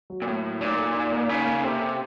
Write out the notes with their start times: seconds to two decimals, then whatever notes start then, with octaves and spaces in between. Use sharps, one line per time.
0.10 F#3
0.22 A#2
0.27 A2 A#3
0.44 F#3
0.61 A#2 D#4
0.79 A4
0.95 D#4
1.12 A#3
1.29 C#3 D#4
1.46 A#3
1.63 C3 A4
1.80 A4